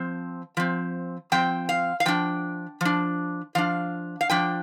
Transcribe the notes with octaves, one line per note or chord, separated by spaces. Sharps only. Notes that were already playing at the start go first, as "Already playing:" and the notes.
Already playing: F3 C4
F3 C4
F3 C4 G5
F5
F5
F3 D4 G5
F3 D4
F3 D4 F5
F5
F3 D4 G5